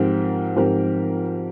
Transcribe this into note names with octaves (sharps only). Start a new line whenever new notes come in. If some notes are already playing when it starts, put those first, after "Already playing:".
Already playing: G#2 F3 C4 G4 A#4
G#2 F3 C4 G4 A#4